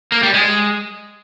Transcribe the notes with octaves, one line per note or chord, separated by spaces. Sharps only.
A#3
G3
G#3